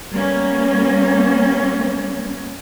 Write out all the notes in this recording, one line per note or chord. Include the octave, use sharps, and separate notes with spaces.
G3 A#3 B3 C#4